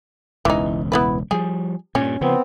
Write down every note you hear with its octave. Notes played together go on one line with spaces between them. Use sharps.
E1 C#2 E3 D#4
B3 E4 B4
F3 G3 G#4
G2 A#2 C#4
C#3 F3 B3 C4